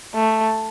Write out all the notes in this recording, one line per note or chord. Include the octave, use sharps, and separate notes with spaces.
A3